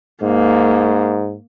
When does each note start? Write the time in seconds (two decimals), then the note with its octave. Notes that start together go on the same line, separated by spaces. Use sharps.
0.23 G#2 A#3